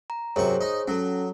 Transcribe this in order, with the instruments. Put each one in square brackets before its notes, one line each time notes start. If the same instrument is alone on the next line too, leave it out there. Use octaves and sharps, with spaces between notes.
[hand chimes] A#5
[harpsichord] F#2 C3 C#6 [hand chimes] G#4 C5 C#5
[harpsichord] D#4
[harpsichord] F#3 [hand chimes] C#4 A4